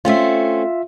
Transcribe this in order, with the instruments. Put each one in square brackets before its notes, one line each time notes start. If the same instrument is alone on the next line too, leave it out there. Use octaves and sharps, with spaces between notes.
[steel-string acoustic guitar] A3 C4 C#4 [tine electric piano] F4 E5